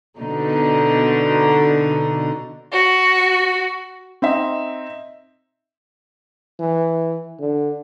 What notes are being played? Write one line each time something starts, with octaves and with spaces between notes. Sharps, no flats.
B2 D3 D#4
F#4
C4 D#4 E5
E3
D3